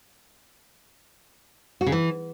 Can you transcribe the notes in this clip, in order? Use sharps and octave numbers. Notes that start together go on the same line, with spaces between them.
F#4
C#3
E3